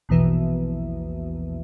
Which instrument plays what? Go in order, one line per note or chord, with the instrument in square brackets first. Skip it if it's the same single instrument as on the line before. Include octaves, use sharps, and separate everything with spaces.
[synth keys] A#1 E2 B2 E3